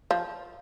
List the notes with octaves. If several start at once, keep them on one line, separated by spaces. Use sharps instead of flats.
F3